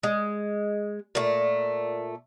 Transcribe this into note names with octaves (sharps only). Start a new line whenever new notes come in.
G#3
A#2 A3